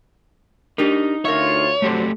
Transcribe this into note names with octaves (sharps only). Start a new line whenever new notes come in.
D4 D#4 G4 A#4
D2 F4 A#4 C#5 E5
F#3 A3 C4 D4 G4 A4